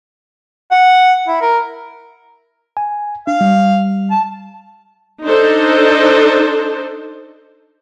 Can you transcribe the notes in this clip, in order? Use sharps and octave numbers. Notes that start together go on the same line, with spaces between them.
F#5
E4
A#4
G#5
D4 F5
G3
A5
D4 D#4 A4 C5